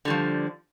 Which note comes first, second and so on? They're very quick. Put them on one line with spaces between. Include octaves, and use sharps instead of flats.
D3 G3 F3